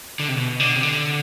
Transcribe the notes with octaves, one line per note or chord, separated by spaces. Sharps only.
D3
C3
B2
D3
C3
D3